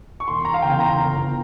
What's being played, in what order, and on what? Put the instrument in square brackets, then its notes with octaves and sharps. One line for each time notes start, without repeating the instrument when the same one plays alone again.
[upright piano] C#6
E1 C6
A#5
F5
E2 C#3 G5
A#5
G1